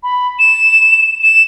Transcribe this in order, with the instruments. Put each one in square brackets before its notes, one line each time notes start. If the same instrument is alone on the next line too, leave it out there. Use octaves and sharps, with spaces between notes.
[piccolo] B5
E7
E7